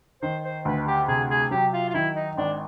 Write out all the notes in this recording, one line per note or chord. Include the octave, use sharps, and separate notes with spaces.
D#3 C5
C5
D2 B4
G4
C3 G#4
G#4
F#3 G4
F4
F4
D#3 E4
D#4
G#1 D4